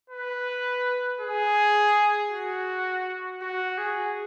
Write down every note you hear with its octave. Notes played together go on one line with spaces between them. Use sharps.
B4
G#4
F#4
F#4
G#4